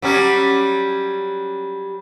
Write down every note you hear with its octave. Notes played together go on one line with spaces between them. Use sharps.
F#3 G3 C#4